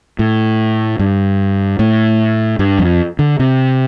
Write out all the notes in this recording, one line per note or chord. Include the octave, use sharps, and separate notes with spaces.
A2
G2
A2
G2
F2
D3
C3